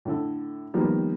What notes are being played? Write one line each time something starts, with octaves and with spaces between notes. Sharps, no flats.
A2 D3 A4
D#3 F3 G3 A#3 B3